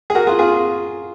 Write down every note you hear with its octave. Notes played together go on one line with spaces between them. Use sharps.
G#4
F#4 A#4
F4 G#4
F4 G#4